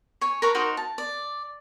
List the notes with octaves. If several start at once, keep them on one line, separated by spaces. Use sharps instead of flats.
C#5 G#5
A#4 B4 C#5 A#5
D#4 F#4 A#4 C5
A5
D5